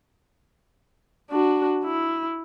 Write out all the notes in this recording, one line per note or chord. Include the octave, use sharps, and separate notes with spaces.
D4 F#4
E4